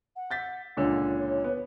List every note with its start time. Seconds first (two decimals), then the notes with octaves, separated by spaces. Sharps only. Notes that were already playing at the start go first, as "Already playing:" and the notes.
0.16 F#5
0.31 G6 A6 B6
0.77 C#2 A#2 D3 C#5
1.44 B3